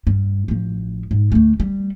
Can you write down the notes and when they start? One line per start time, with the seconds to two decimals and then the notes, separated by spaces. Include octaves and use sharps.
0.07 G2
0.48 A1 F3
1.11 G#2
1.32 D2 A3
1.60 G3